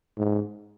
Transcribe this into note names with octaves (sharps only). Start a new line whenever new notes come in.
G#2